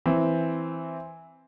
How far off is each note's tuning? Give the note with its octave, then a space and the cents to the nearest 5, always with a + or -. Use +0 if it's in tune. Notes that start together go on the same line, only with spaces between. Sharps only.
E3 +0 C4 +0